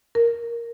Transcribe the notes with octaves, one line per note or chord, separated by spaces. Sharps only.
A#4